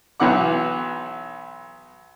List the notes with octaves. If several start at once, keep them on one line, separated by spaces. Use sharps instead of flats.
B1 E3 B3 F#5 D6